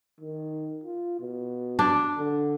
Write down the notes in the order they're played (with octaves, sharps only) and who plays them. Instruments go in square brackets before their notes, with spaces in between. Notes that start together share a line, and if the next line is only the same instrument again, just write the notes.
[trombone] D#3
F4
B2
[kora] D4
[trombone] D3